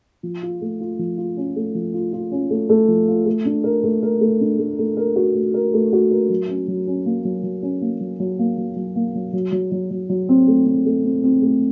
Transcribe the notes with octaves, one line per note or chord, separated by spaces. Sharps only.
F3
F4
A3
F4
F3
F4
C#4
A3
F3
F4
F4
C#4
A3
A3
F3
F4
A3
D4
A#4
A3
A#4
A3
D4
A3
A3
A#4
F#4
A3
A#4
A3
F#4
A#4
F#3
C#4
F#3
C#4
A#3
F#3
F#3
C#4
A#3
F#3
F#3
A#3
F#3
F#3
A#3
F#3
F#3
F#3
F#3
F#3
F#3
C4
A3
C4
A3
C4
C4
A3